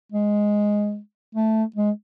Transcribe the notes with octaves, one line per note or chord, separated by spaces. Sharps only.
G#3
A3
G#3